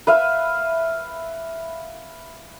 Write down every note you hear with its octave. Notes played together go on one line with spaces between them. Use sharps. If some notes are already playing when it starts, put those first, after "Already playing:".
B4 E5 F5